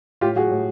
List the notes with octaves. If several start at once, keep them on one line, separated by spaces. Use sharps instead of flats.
A2 F4 G4
F#3 F#4 G#4
A2